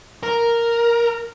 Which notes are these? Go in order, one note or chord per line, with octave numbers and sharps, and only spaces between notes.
A#4